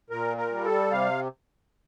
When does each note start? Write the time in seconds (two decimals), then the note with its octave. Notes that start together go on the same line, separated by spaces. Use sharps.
0.10 A#2 A#4
0.37 A#4
0.51 G3
0.64 A4
0.91 C3 F5